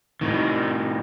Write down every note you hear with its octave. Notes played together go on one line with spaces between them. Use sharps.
A2 D#3